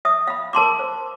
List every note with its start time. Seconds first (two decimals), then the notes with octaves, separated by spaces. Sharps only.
0.05 E5 D#6
0.27 F5 B5
0.53 A#4 A5 C6 D6
0.79 C5